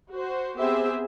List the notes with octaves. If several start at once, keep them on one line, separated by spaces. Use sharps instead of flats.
F#4 C5
B3 C4 G4 G#4 C5 E5